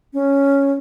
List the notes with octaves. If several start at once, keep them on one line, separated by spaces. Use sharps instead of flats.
C#4